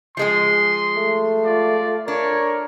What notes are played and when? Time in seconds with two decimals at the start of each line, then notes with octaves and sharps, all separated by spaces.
0.17 F3 G#3 G#4 C6
0.96 A3
1.45 F4 D5
2.08 D4 A#4 C#5